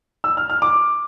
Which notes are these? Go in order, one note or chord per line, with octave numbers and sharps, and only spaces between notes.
E6
F6
F6
D6